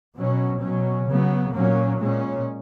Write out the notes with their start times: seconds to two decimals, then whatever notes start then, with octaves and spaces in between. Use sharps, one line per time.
0.16 B2 F#3 C#4
0.62 B2 F#3 C#4
1.07 C#3 F#3 B3
1.53 A#2 F#3 A#3 C#4
1.99 A#2 G#3 C#4